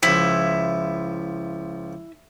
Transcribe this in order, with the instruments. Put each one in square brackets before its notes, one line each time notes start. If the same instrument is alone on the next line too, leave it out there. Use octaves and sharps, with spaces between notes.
[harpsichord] C#2 F3 [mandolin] E4